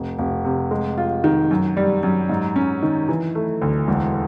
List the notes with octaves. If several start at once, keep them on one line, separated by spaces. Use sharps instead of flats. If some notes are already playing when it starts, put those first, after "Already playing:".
Already playing: F1
F1
C3
G#3
F4
D#3
F#2
G3
F#2
G#2
C#4
D#3
E3
A3
D2
E1